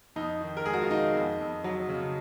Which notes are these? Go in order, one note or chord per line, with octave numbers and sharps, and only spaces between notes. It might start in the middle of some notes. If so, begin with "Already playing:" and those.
F2 D#4
D#3
A#4
G#3 G#4
F#4
F4
D#3 D#4
F2
F2
F#3
C#3